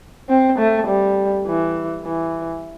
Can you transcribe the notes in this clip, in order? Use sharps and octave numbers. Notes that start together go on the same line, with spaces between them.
C4
A3
G3
E3
E3